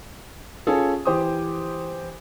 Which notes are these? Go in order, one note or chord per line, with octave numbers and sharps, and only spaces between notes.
C#4 F4 G#4 A4
E3 G4 C5 D6 D#6